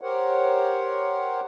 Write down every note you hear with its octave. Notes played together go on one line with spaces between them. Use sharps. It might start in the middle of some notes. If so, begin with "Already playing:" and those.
G4 A#4 C5 C#5 F#5